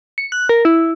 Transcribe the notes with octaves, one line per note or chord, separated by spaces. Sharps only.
C#7
F#6
A#4
E4